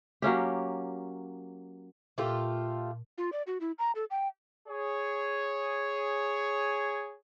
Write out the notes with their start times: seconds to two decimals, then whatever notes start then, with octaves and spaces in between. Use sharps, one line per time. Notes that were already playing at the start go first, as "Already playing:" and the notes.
0.22 F#3 A#3 C#4 G4
2.18 A#2 A3 F4 G4
3.18 F4
3.32 D5
3.47 F#4
3.61 E4
3.79 A#5
3.95 A4
4.10 G5
4.68 G#4 C#5